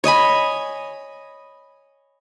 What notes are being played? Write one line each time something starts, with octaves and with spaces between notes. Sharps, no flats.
C#5 D#5 G#5 B5